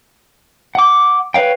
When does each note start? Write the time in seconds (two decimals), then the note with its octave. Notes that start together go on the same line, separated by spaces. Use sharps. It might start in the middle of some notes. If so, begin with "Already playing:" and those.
0.75 F#5 D6
1.34 B4 C#5 F5 G5